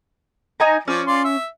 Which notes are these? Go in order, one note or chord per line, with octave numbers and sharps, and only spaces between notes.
D#4 G#5 A#5
F3 C#4 D5
F4 D5 C6
E5